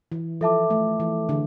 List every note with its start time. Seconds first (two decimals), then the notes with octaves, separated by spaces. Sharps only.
0.12 E3
0.41 F3 A4 E5 A5 D6
0.70 A3
1.00 E3
1.29 D3